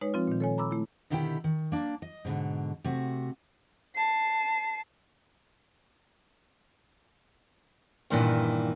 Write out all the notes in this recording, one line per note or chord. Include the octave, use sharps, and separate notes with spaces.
G#3 D#4 B4 C#5
F3 C4 F4
A#2 D#3
A4 C#5 G#5
A#5 B5 D6 E6
A3 E4
B2 D3 D#3 E4 G4 G5
D#3
A#3 D4
D#5
G#2 B2 D3
C3 A3 F#4
A5 C7
G2 A#2 D#3 E3 D4